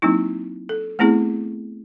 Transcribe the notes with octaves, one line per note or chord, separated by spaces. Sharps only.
F#3 A#3 C4 D#4 E4
A4
A3 B3 C4 E4 G#4